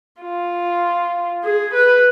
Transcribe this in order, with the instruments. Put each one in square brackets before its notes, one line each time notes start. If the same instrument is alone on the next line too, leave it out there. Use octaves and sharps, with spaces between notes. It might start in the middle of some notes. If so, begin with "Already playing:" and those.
[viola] F4
G#4
B4